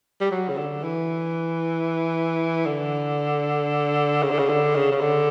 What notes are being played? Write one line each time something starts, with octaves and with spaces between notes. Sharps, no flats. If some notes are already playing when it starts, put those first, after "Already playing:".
G3
F#3
C#3
D3
E3
D3
C#3
D3
C#3
D3
C#3
C#3
D3